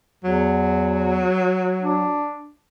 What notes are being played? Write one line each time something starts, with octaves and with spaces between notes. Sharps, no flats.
E2 F#3
D4